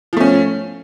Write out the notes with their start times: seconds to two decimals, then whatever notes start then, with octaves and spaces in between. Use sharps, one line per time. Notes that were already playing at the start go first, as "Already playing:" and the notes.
0.13 F3
0.17 A3
0.20 C#4